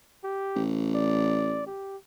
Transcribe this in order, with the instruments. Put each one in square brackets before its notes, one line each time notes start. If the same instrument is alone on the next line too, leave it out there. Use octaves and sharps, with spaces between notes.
[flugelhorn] G4
[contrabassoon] A1
[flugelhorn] D5
G4